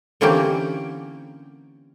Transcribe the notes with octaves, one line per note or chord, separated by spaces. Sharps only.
D3 E3 A#3 C4 C#4 G4